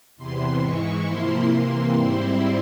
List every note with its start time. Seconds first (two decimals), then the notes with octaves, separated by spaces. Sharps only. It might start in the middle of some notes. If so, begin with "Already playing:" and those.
0.17 E2 C3 E3 C6
0.61 G#2 E3 G#3 E4 C#6
1.04 C3 F3 A#3 E4 C6
1.48 C3 E3 A#3 C6
1.92 G#2 G3 C4 E4